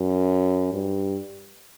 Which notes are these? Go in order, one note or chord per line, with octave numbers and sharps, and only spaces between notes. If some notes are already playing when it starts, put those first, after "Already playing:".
Already playing: F#2
G2